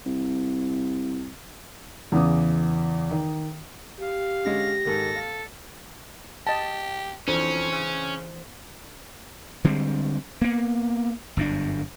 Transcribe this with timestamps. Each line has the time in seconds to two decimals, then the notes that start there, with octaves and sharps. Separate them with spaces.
0.06 C2
2.12 E2 C#3 E3 D6 D#6
3.11 D#3
4.00 G4 F5
4.45 D3 G#3 C#4 A#6
4.85 G#2 D#3 A4
5.15 F5
6.47 G4 D#5 A5
7.28 F2 E3 C#4 D4 C5
7.72 C#3
9.64 D3 G3 G#3 C4
10.42 A#3 B3
11.37 G1 F#2 A2 D4